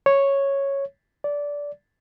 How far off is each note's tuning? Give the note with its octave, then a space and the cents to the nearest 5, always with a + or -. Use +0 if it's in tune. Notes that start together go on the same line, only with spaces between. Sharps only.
C#5 -5
D5 -15